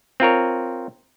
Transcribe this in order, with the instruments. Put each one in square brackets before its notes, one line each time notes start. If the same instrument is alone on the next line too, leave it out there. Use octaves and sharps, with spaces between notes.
[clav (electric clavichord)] C4 F4 A#4 C#5